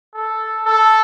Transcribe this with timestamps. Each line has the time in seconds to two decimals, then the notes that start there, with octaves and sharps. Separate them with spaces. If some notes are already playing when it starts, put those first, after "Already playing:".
0.14 A4
0.65 A4